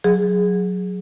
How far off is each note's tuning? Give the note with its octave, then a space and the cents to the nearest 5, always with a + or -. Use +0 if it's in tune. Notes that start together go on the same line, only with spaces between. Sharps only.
F#3 -10 G#4 +0